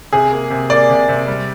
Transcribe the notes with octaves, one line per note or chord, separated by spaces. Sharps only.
C3 G#4
A#3
C3
A#3 D5
C3
C3
G3